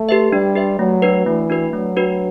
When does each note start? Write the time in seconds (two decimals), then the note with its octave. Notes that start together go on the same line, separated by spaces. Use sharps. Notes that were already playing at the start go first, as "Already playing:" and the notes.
Already playing: A3
0.09 G4 B4 E5
0.32 G3 D4
0.55 G4 B4 E5
0.79 F#3 A3
1.02 D4 F#4 B4
1.26 E3 A3
1.50 D4 F#4 B4
1.73 F#3 A3
1.96 D4 F#4 B4